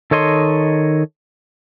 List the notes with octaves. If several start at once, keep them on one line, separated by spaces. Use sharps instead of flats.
D#3 A4 C#5 D#5 C6